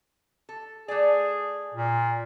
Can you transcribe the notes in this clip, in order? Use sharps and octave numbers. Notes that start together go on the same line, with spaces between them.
A4
A3 G#4 D5
A#2